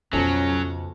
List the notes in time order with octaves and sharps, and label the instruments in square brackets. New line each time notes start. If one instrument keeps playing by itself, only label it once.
[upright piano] B1 F3 A5 [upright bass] F2 C#3 [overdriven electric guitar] F#3 [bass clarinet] C#4